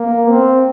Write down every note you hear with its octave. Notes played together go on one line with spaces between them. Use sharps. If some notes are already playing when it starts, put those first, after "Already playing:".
Already playing: A#3
C4